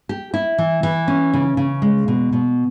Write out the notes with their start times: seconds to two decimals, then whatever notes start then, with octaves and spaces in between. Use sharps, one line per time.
0.09 G4
0.34 E4
0.58 E3
0.83 E3
1.08 C#4
1.33 C#3
1.57 C#3
1.82 G#3
2.08 B2
2.33 B2